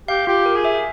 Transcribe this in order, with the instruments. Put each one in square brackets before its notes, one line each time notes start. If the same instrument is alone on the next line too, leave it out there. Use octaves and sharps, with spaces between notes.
[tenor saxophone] G4 [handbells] F5
[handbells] F4 [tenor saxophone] G4
[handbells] A#4
[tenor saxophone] G#4
[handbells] E5